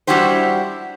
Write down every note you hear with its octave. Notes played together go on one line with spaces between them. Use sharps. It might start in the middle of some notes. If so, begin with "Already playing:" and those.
G3 D4 E4 F#4 G4 C5